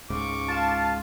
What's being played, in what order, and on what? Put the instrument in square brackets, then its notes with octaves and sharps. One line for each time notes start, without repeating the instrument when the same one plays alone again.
[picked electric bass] C#2 G#2 C#3 [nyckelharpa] C#6 D6
[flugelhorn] F4 [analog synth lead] A5